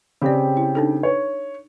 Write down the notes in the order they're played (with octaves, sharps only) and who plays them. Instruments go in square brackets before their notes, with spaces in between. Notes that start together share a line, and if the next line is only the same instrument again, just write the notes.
[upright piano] C#3 C4 G4 [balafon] G#4 D5
[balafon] E4
D4 D#4 A4
[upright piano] C#5